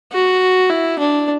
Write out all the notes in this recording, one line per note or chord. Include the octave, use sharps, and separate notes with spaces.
F#4
E4
D4